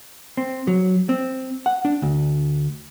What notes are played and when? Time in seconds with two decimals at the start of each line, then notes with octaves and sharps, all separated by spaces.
0.37 C4
0.67 F#3
1.09 C4
1.66 F#5
1.85 D4
2.02 D2